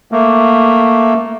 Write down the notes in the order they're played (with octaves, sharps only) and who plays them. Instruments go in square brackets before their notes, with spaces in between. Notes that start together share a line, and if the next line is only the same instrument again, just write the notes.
[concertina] A3 A#3